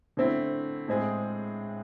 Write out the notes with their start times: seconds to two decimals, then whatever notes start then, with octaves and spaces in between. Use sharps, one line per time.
0.17 D3 A3 C4 E4
0.88 A2 G#3 C4 G#4